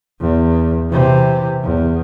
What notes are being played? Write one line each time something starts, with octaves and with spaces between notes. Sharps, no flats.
E2
C3 E3
E2